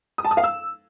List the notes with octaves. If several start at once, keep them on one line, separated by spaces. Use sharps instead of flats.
D#6
A5
D#6
F5
E6